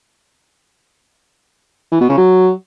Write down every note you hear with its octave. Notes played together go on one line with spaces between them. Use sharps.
E3
B2
C#3
F#3